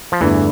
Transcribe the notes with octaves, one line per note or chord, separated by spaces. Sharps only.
F3
E2 G2 D3 E3 A3